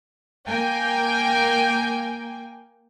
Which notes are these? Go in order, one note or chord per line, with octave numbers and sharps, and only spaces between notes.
A#3 G5 G#5